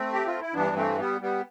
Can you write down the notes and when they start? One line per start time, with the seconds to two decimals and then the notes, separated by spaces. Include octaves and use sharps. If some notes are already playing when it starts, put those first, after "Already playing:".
Already playing: A3 C4
0.13 G4
0.27 F4
0.41 E4
0.53 G2 E3 B3 D4
0.76 A3 C4
0.99 G3 B3
1.21 G3 B3